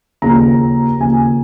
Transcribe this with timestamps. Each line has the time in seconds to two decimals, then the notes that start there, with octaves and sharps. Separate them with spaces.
0.22 D#2 C#3 F3 A#3 A#5
1.00 D#2 C#3 F3 A#3 G#5